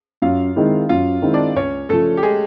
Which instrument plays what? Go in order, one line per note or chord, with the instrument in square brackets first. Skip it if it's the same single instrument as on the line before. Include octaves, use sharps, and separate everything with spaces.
[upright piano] F#2 [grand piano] F4 F5
[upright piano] D#3 G#3 C4 E4
[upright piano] F#2 [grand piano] F4 F5
[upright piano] D#3 G#3 C4 E4
[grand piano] D4 D5
[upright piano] C#2 [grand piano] C#4 C#5
[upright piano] C#3 F3 [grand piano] A3 A4
[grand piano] G4
G#3 G#4